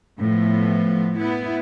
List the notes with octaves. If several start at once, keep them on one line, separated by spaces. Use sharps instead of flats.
A2 F3 B3
B3 E4